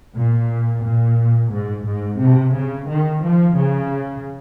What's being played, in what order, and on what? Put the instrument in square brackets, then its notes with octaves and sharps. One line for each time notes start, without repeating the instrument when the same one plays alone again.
[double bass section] A#2
A#2
G#2
G#2
C3
C#3
D#3
F3
C#3